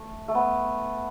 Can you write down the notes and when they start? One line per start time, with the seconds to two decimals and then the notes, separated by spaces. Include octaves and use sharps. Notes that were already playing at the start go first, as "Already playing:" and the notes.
Already playing: A3
0.28 A3
0.35 B3